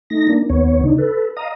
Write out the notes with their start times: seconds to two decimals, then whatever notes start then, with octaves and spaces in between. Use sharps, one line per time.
0.10 A3 D#4 A#6
0.29 A#3 D4
0.50 D#2 B3 C#5
0.83 C#3 D4 D#4
0.98 A4 B4
1.37 D#5 F5 A#5 D#6